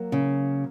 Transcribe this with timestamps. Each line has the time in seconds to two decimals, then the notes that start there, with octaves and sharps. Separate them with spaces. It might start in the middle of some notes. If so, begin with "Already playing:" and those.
Already playing: F#3 A#3
0.12 C#3